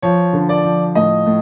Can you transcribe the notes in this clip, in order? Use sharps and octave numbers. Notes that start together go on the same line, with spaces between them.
F3 C#5
D3
D5
F3
A2 D#5
A2